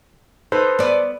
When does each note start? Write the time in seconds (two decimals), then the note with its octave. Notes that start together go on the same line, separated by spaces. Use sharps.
0.52 D#4 A4 B4 C5
0.79 B3 D5